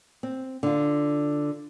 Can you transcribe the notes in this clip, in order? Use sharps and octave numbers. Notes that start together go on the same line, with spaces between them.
C4
D3 F4